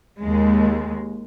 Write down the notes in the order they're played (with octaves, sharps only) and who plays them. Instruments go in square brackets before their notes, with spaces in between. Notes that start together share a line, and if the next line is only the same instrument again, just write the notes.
[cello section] D#2 G#3